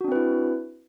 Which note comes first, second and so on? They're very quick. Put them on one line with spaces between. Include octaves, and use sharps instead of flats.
F#4 D4 C4 B4 E4